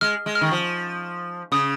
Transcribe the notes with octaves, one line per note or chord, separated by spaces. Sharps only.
G#3 F6
G#3
F6
D#3
F3
C#3 D#6